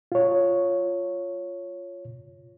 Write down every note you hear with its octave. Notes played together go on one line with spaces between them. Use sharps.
F4 C#5